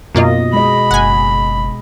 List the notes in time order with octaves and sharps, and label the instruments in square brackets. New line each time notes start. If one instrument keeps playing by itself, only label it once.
[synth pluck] F#2 A#3 F4 [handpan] B2 D#5
[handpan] G#3 D#5 [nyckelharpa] B5
[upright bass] F#1 [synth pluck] F#5 G#5